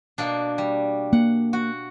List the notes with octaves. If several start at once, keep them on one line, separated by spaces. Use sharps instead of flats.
B2 A#3 D4
G3
A#3 F#5
F#4